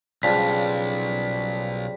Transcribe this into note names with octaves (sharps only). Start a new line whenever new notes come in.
B1 C#3 F3 G3 B6